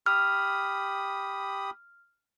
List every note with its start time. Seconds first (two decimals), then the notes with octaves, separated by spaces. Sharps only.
0.06 G4 B5 D#6 F6